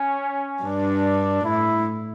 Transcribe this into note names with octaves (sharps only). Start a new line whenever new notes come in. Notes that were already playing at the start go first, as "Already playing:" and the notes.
Already playing: C#4
G2 D4
A2 E4